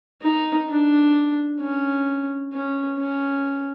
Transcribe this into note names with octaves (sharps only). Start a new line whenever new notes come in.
D#4
D4
C#4
C#4
C#4